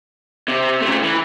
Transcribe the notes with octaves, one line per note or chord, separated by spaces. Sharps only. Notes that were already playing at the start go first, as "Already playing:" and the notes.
C3
C#3 A3
E3